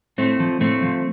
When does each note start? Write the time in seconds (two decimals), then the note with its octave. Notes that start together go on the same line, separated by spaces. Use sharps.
0.18 A2 A3 C4
0.40 F3
0.60 A2 A3 C4
0.83 F3